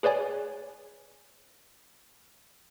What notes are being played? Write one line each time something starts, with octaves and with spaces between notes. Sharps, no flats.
G#4 B4 C#5 D5 G#5